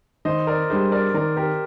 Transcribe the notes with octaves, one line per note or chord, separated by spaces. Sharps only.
D#3 C5 D#5
A#4 D5
G3 D4 G#4 C5 D#5
A#4 D5
D#3 A#4 D5
G4 A#4